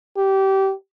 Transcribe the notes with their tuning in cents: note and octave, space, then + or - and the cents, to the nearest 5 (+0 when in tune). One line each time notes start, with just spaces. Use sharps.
G4 -20